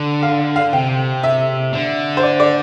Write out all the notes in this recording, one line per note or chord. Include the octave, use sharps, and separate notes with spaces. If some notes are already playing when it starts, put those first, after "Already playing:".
Already playing: D3
F5
F5
C3 G5
E5
D3
C5
D5
D5